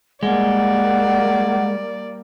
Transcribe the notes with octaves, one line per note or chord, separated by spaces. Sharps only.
G3 G#3 A#3 D5 F#5